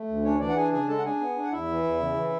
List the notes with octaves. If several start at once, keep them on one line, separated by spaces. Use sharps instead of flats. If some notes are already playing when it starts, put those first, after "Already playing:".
Already playing: A3
D2
C#4 D4 C#5
E3 D4 D5
F#5
D4 G#4 G#5
C#3 G#4 G#5
G#3 A4 A5
F#5
D4 G#4 G#5
B3
D4
F#5
E2 E4 E5
E3
E2
C#3
E3